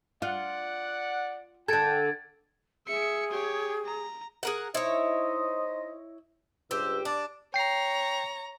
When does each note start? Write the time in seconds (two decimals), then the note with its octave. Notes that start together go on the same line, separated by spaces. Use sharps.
0.22 F4 D5 F#5
1.68 D3 A4 G5 G#6 A6 D7
2.87 G#4 E5 C#7
3.31 G4 C#5
3.86 A#5
4.43 G#4 A#4 F#5
4.75 D#4 E4 C5 C#5 D#5
6.71 C#2 G2 G4 C5 E6
7.05 D4 D5
7.54 C#5 G5 A#5 C7